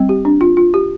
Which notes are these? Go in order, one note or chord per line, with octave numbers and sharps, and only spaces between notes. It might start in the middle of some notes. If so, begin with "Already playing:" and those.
Already playing: G3 C4
G4
D4
F4
F4
G4